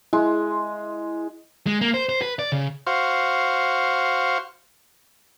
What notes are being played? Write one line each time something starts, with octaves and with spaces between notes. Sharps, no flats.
G#3 E4
G#3
A#3
C5
C5
B4
D5
C#3
F#4 C5 F5